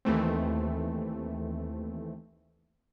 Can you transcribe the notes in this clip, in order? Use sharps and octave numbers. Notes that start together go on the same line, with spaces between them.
D#2 E3 A3 C4